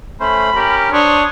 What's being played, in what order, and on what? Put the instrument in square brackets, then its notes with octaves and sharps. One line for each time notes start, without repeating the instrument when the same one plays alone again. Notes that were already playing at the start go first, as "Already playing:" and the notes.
[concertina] A3 C#4 C5 [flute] B5
[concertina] C#4 A#4 [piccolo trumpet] G4
[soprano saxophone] D4 [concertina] C5 [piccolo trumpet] C#5 [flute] D#6